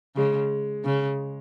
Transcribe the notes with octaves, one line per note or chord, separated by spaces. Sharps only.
C#3 G#3
C#3